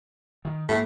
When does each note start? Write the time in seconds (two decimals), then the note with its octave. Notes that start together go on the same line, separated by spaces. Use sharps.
0.45 D#3
0.69 G#2 A3 A#3